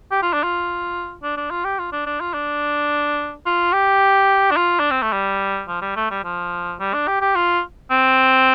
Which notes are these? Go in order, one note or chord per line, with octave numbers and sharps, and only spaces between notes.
G4
F4
D4
F4
D4
D4
F4
G4
F4
D4
D4
F4
D4
F4
G4
D4
F4
D4
C4
A3
G3
F3
G3
A3
G3
F3
G3
D4
G4
G4
F4
C4